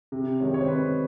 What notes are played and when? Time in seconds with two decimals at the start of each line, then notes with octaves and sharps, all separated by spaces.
0.12 C3
0.40 D#3 G#3 C#4
0.54 C#5
0.61 C5
0.68 C3 B4